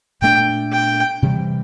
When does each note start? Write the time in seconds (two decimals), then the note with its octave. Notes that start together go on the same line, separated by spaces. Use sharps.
0.22 A#2 A3 D4 G5
0.72 G5
1.22 C3 E3 G3